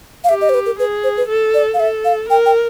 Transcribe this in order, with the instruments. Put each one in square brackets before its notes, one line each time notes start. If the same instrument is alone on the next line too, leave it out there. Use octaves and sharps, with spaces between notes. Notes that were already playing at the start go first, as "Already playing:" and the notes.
[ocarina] F5
[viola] G4 [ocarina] E5
[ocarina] D#5
C5
B4
A#4
[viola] G#4 [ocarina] B4
[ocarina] C5
B4
[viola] A4
[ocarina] D5
F5
[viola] A4 [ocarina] E5
[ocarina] F5
[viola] A#4 [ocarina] G5
[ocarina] G5